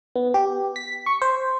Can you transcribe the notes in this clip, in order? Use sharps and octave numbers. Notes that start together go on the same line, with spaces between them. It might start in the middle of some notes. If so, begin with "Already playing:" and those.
B3
G4
B6
C#6
C5